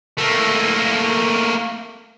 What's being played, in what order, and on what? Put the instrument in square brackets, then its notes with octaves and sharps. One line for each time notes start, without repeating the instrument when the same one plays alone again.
[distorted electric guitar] A3 A#3